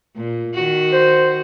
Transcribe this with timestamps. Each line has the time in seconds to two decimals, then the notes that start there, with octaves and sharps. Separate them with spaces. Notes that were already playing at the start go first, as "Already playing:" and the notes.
0.16 A#2
0.54 D#3 F#4
0.93 C5